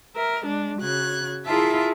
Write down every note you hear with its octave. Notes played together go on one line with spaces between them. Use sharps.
A#4 E5
G#3 D4
C#3 F#4 F#6 G#6
E4 F4 G#4 A#4 E5 A5